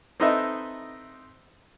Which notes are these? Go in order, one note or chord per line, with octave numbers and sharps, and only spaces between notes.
C4 D#4 A4 B4 D#5 E5